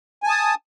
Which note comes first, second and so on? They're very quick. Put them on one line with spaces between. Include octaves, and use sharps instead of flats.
G#5 A5 D#6